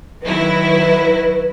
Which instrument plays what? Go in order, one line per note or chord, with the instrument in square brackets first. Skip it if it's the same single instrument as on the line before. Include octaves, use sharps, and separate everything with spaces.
[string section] D#3 F#3 E4 [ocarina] B4